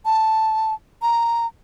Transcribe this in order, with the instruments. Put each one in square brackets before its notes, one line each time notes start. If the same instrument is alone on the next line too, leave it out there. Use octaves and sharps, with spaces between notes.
[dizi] A5
A#5